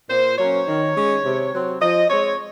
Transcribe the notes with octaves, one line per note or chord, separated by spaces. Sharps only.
A#2 C5
F#3 A#3 C#4 C#5
D#3
G#3 C#4
C3
F#3 C4
F3 D#5
G#3 C4 C#5